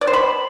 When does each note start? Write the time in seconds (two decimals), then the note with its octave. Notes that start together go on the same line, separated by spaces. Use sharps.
0.01 D5
0.07 C5
0.13 B5